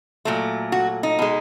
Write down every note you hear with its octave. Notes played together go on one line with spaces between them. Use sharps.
A#2 F#3 A3
F#4
D#4
B2 G#3